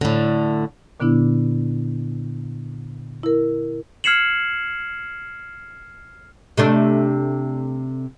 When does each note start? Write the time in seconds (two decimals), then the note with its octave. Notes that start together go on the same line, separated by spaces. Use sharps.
0.01 A2 D3
1.00 A#2 D3 B3 D4 E4
3.23 E4 A#4
4.04 F6 G#6 C7 C#7 E7 F#7
6.57 C3 A3 D4